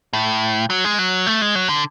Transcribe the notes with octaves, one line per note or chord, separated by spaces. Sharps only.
A2
F#3
G#3
F#3
A3
G#3
F#3
D3